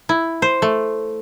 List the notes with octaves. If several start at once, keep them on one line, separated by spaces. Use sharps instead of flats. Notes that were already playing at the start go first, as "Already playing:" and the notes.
E4
C5
A3